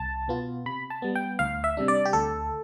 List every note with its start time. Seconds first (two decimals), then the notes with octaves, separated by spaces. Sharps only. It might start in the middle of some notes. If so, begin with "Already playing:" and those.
Already playing: C2 A5
0.28 B2 B3 F4
0.66 C3 B5
0.90 A5
1.02 G3 B3
1.15 G5
1.39 D2 F5
1.64 E5
1.77 C3 G3 D4
1.88 D5
2.05 G4
2.13 D2 A4